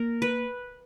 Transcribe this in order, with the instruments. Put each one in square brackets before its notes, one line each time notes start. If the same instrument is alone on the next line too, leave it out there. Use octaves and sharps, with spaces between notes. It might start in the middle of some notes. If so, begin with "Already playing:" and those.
Already playing: [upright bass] A#3 [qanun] A#4
[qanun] B4